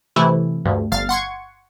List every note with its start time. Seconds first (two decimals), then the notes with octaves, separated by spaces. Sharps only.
0.16 C3 E3 A3 E4
0.65 D2 G2
0.92 G1 F5 F6 A6
1.09 F#5 C6 C#6 G#6